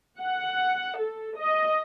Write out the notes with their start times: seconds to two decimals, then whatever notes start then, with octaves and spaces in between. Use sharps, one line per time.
0.19 F#5
0.98 A4
1.38 D#5